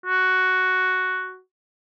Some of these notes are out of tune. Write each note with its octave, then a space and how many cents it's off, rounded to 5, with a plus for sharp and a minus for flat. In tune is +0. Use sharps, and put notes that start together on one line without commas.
F#4 +5